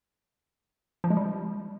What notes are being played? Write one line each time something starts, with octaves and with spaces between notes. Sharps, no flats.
F3
G#3
G3